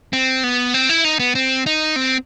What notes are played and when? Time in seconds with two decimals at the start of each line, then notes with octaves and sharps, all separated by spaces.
0.13 C4
0.44 B3
0.74 C4
0.89 E4
1.04 D#4
1.19 B3
1.35 C4
1.66 D#4
1.96 C4